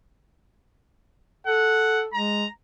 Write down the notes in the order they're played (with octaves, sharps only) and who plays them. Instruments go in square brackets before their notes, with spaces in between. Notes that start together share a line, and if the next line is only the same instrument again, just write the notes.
[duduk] A4 [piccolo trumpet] F#5
[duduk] G#3 [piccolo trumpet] A#5